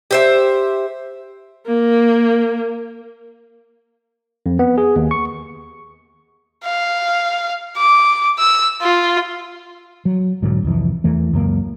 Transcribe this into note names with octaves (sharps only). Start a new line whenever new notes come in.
G4 C5 E5
A#3
F2
B3
G#4
D#2
C#6
F5
D6
E6
F4
F#3
B1 G#2 D3 F#3
C2 F2 E3
E2 E3 A3
C#2 F#2 F#3 A#3